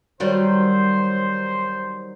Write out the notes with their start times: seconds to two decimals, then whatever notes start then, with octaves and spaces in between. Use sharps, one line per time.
0.20 D#3 F#3 G3 C5